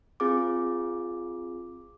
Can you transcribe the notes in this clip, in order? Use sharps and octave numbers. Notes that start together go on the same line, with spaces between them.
C4 F4 G#4 D6